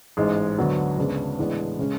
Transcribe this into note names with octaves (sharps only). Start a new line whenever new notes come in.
A1 G#2 G#3
D2 D3 F#3 B3 D4
D2 C#3 G#3 B3 D4
A1 A2 G#3 B3 D4
C#3 G#3 C#4